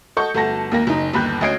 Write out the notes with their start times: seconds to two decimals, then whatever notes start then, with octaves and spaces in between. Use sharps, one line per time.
0.17 A4 D#5 F#5 C#6 G6
0.34 G1 A3 F#4 A5 A#6
0.72 D#2 A#3 A#6
0.87 F#1 D#4
1.13 G1 D#2 B5 F#6 G6
1.41 D2 C#4 D#5 G#6 C7 D7